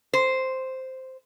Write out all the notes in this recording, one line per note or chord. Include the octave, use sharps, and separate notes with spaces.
C5